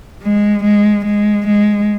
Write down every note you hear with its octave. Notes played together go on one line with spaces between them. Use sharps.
G#3
G#3
G#3
G#3